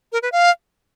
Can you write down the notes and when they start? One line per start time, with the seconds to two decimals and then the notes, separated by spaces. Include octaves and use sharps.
0.12 A#4
0.22 B4
0.32 F5